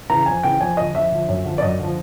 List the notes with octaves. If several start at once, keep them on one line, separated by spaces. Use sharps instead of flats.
C#3 E3 A#5
F2 G#5
C#3 E3 G5
F2 G#5
D3 F3 D#5
F2 E5
D3 F3
F#2
D3 F3
D5
F#2 D#5
D3 F3